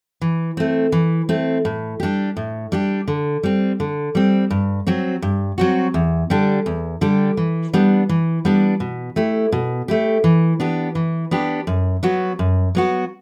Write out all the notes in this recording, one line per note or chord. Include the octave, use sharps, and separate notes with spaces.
E3
A3 C4
E3
A3 C4
A2
G3 D4 G4
A2
G3 D4 G4
D3
G3 C4
D3
G3 C4
G2
F#3 C4 F#4
G2
F#3 C4 F#4
E2
D3 G3 D4 G4
E2
D3 G3 D4 G4
E3
G3 B3 D4
E3
G3 B3 D4
B2
A3 E4 G4
B2
A3 E4 G4
E3
B3 D4 G4
E3
B3 D4 G4
F#2
F#3 B3 F#4
F#2
F#3 B3 F#4